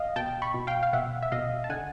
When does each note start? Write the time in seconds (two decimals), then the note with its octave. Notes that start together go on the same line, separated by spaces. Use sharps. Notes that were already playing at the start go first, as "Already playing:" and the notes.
Already playing: D#5 F5
0.16 B2 G5 A5
0.42 B5 C#6
0.54 B2
0.67 F5 G5
0.83 F5
0.93 B2 E5 F#5
1.22 E5
1.32 B2 D#5 F5
1.64 A5
1.70 D3 F#5 G#5